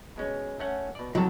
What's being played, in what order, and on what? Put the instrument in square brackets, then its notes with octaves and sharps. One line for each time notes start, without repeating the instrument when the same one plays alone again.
[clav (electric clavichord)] B2 G#3 C#4
A3 C#4 F#5
B2 D5
[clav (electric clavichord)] A2 C3 A5 [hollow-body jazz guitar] F#3